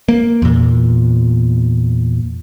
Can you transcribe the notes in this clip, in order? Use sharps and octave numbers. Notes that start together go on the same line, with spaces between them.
A#3
E2 A#2